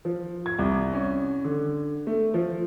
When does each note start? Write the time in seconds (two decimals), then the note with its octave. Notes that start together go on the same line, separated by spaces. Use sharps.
0.05 F3
0.46 G#6
0.59 C2
0.93 C#4
1.44 D3
2.07 A3
2.34 F3